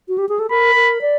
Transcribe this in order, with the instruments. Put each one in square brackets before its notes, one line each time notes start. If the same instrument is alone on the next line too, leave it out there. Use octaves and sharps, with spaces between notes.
[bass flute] F#4
G4
G#4
A4
[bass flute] A#4 [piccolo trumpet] B5
[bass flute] A#4
D5